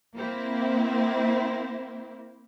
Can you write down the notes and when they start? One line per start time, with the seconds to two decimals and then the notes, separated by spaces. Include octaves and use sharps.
0.16 A#3 C4 E4